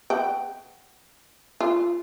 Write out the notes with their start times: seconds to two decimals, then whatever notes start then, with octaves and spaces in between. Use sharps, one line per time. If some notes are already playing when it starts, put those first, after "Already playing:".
0.10 F#5 G5
1.60 F4